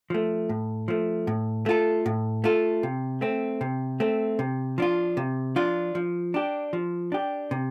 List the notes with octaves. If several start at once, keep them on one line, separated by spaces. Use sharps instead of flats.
F3 A3
A2
F3 A3
A2
A3 F4 A4
A2
A3 F4 A4
C3
A3 C4
C3
A3 C4
C3
F3 D4 F4
C3
F3 D4 F4
F3
D4 G4
F3
D4 G4
C3